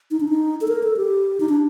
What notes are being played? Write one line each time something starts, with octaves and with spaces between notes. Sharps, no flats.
D#4
D4
D#4
A4
A#4
A4
G4
D#4
D4